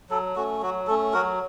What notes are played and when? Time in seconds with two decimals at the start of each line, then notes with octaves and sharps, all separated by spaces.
0.10 F#3 A4
0.36 A3 C#4 F#4
0.61 F#3 F#4
0.87 A3 C#4 A4
1.13 F#3 F#4 A#4